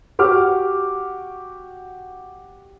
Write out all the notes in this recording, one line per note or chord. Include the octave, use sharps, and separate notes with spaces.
F#4 G4 D6 F6